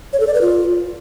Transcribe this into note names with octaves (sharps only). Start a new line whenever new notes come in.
C#5
A4
D5
B4
F4